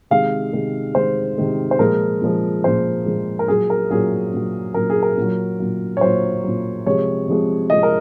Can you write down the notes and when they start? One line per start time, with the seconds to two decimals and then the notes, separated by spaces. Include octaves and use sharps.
0.11 C3 D#3 G#3 F5
0.53 C3 D#3 G#3
0.95 C3 D#3 G#3 C5
1.38 C3 D#3 G#3
1.71 C5
1.79 A#2 F3 G#3 A#4
2.21 A#2 F3 G#3
2.64 A#2 F3 G#3 C5
3.06 A#2 F3 G#3
3.39 A#4
3.48 A#2 F#3 G#4
3.70 A#4
3.90 A#2 F#3 G#4
4.33 A#2 F#3
4.74 A#2 F#3 A#4
4.90 G#4
5.03 A#4
5.17 A#2 F#3
5.60 A#2 F#3
5.97 C#5
6.01 A#2 F#3 C5
6.44 A#2 F#3
6.86 C3 F3 G#3 C#5
7.28 C3 F3 G#3
7.70 C3 F3 G#3 D#5
7.83 A#4